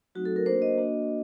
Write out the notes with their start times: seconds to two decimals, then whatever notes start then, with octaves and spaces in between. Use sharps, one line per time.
0.15 F#3 A3 C4 D#4 F#4
0.25 A4
0.36 A#4
0.46 A#3 D4 F#4 C5
0.62 D#5
0.77 A#3 D4 F#4